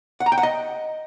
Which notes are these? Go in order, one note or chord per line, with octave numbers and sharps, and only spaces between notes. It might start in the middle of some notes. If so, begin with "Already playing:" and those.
F#5
A#5
G5
F#5
D#5